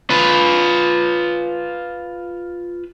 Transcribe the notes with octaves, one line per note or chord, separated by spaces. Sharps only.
F4 B4